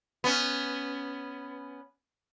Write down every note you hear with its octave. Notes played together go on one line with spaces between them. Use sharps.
B3 C#4